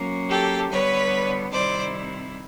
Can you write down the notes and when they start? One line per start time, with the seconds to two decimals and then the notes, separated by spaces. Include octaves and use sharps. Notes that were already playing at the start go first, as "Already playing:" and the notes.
Already playing: F#3 A#3 C#4
0.30 G4 A4
0.71 D3 G3 B3 B4 C#5
1.52 C3 D#3 G3 C4 E4 C5 D5